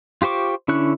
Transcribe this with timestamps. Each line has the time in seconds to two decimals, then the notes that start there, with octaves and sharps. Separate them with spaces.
0.22 F4 G4 C5 C#6 D6
0.68 D3 C#4 E4 C#6 F#6